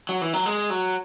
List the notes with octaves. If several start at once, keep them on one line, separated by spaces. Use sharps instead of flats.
F#3
E3
F#3
G#3
F#3